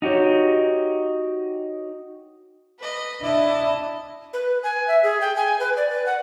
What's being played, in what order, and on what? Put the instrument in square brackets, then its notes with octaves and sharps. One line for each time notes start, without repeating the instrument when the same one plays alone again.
[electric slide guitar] D#4 F#4 G4 C#5
[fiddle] B4 D#5
[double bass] D4 E4 [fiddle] D#5 A5
[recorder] B4
G#5
E5
G#4
G5
G#5
B4
D5
B4
F#5